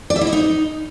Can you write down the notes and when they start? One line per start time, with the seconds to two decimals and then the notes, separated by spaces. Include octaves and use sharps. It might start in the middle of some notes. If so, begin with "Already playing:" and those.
0.10 D5
0.16 E5
0.21 E4
0.27 D#5
0.33 D#4